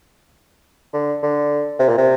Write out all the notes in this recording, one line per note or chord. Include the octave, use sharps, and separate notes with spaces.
D3
D3
C3
A#2
C3